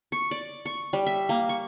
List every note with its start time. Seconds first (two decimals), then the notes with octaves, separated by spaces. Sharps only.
0.12 C#6
0.31 D5
0.65 C#6
0.93 G3
1.06 E5
1.29 A#3
1.49 C#6